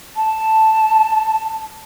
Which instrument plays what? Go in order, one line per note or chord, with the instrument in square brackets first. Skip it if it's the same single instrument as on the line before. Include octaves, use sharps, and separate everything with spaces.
[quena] A5